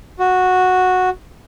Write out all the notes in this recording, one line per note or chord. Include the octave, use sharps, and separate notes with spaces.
F#4